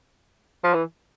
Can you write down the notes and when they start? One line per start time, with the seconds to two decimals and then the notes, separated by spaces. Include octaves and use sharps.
0.64 F3
0.74 E3